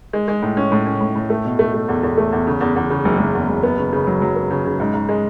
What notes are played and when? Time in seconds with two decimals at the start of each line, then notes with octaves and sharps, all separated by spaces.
0.13 G#3
0.28 G#3
0.42 A2
0.57 C#4
0.72 A2
0.86 C#4
1.01 A2
1.15 A2
1.30 A3
1.45 B2
1.59 A3
1.74 A3
1.88 E2
2.03 E2
2.18 A3
2.32 E2
2.47 C#3
2.61 E2
2.76 E2
2.90 C#3
3.05 F#1
3.19 F#1
3.35 E2
3.48 F#1
3.63 B3
3.78 C#3
3.93 C#3
4.07 F#3
4.22 F#3
4.36 B3
4.51 C#3
4.65 C#3
4.80 G#2
4.94 G#2
5.09 G#3